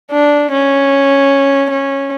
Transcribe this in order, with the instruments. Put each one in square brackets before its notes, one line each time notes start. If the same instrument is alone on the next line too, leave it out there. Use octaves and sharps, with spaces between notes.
[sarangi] D4
C#4
C#4